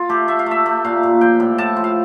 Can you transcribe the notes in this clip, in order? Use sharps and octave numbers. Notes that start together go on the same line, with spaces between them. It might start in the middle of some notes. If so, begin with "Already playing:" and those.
Already playing: F4
A3 G4
A3 E5
F5
A3 E5
A3
A#2 F5
A#2
F3 G5
A2
A2 A5
F3
F5